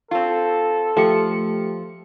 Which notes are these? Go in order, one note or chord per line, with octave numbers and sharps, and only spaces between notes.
C4 F4 A4
F3 A3 G4 C#7